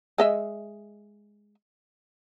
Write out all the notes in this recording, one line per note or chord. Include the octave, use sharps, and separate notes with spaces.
G#3 D#5 E5